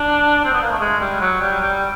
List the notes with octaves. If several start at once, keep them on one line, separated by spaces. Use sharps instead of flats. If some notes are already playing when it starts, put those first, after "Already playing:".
Already playing: D4
C4
B3
A#3
A3
G#3
G3
F#3
G3
G3